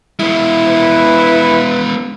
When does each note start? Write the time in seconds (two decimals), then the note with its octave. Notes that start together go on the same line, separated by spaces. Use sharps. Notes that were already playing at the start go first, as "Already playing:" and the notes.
0.20 G#3 B3 E4
0.68 B4